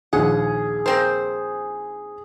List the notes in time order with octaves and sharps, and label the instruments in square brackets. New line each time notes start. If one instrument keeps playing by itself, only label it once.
[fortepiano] A#1 D#2 [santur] G#4 [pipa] F#5
[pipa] A#3 C4 C5